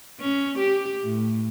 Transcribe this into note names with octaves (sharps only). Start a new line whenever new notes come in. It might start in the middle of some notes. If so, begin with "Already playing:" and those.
C#4
G4
A2